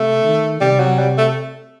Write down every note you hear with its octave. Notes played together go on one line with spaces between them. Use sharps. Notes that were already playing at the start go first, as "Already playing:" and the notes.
Already playing: C3 A3
D#3
C3 G3
F#3
G3
A3